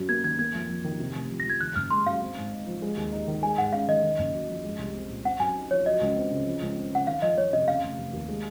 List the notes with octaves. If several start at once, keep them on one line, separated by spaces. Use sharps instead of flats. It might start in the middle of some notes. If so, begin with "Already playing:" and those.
Already playing: F#2 F#3
A#3 G#6
D#3 G#6
A#3 G#6
F2
F2
D#3
C3
F1
F3
A#6
F2 G#6
D#3 F#6
F#1 F6
G#3 C6
F#2 F5
C4
G#2
D#4
F3
G#3
D#2
D#4
D#3
G#3 G#5
G#2 F#5
C#4 F5
D#3 D#5
D#3
F#1
F#3
F2
G#3
C2
C4
A#2
C4 F#5
F#2 G#5
D#4
F3 C#5
F#3 D#5
C#2
C4
C#3
F3
C#2
C4
C#3 F#5
D#3 F5
F2 D#5
F2 C#5
C3 D#5
C#3 F5
F1
F1
D#2
G#3